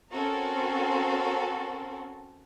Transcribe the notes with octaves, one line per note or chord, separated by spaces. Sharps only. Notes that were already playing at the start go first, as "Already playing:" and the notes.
C4 C#4 F#4 A4 A#4